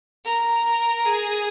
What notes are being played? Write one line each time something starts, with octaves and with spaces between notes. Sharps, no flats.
A#4
G#4